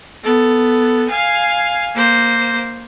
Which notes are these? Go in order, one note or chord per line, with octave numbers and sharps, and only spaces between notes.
B3 A4
F5 G#5
A#3 C5